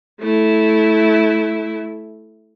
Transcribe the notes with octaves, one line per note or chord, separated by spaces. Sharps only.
A3 E4